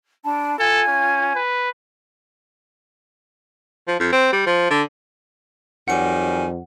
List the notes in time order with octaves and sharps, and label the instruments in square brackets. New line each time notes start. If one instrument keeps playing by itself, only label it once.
[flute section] D4 A5 B5
[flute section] F4 G#5 G#6 [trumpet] A4
[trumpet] C#4
B4
[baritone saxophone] F3
F2
C4
G3
F3
D3
[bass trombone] F2 [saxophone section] D#3 F#3 G3 [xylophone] F#5 C#7 [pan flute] G#5